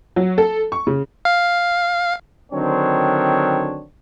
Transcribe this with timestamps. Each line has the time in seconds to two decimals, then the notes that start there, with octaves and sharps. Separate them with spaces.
0.16 F#3
0.38 A4
0.72 C#6
0.87 C#3
1.25 F5
2.52 D3 D#3 F#3 C4 D4 C#5